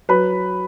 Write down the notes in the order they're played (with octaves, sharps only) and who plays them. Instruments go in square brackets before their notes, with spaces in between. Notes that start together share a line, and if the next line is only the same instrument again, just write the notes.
[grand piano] F#3 B4 B5